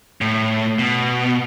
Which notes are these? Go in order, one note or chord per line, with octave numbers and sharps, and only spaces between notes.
A2
B2